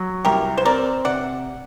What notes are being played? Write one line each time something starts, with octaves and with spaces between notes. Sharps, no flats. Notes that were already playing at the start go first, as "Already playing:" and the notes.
Already playing: F#3
C2 G4 A#4
C5
C4 A#4 D5
C3 D5 F#5